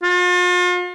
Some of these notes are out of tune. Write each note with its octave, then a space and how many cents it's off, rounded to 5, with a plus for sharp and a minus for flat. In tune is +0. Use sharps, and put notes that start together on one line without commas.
F4 +40